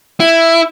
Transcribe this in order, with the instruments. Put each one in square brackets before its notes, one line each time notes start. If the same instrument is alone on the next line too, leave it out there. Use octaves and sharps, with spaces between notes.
[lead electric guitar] E4